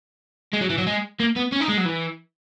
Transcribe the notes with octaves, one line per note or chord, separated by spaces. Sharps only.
G#3
F#3
E3
F#3
G#3
A#3
B3
C#4
D#4
G#3
F#3
E3